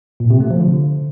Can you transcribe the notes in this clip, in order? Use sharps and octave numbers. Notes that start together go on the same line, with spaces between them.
A#2
C3
A3
F3
D3